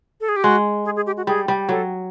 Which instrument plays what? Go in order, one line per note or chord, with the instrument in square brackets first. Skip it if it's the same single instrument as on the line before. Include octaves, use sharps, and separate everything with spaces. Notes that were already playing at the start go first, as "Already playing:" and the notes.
[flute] A4
G#4
G4
[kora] G#3 [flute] F#4
[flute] G#4
G#4
G4
F#4
[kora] G3 [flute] G#4
[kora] G3
[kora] F#3 [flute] A4